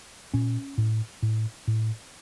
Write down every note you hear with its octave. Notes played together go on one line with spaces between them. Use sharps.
A#2 C#4
A2
A2
A2